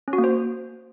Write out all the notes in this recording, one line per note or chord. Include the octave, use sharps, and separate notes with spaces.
C#4
F#4
A#3
C5